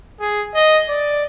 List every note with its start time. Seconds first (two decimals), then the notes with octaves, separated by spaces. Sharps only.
0.20 G#4
0.55 D#5
0.89 D5